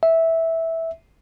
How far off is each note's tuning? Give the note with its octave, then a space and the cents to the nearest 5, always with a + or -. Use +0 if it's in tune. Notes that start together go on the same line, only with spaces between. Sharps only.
E5 -10